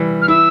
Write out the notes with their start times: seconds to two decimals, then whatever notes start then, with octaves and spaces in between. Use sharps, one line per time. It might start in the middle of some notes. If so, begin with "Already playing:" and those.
Already playing: E3 G3
0.22 F6
0.28 E4 E6